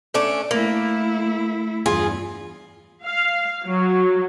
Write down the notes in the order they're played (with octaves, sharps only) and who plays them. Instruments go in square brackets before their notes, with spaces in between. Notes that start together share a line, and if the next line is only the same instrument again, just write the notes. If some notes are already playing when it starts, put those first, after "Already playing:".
[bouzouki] A3 C#4 D4
[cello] A3 E4 [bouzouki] A#3
[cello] E2 G2 [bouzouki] F4 G#4
[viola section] F5
F#3